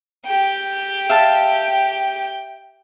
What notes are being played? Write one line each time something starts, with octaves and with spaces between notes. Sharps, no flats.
G4 G5
E5 F5 A5